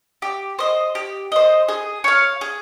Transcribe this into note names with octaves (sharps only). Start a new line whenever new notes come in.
G4
C5 D#5
G4
C5 D#5
G#4
C#5 F5
G#4